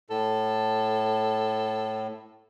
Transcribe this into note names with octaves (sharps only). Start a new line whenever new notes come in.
A2 A4